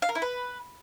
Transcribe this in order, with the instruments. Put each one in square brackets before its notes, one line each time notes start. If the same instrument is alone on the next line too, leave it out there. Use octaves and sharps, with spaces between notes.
[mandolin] F5
A#4
E4
B4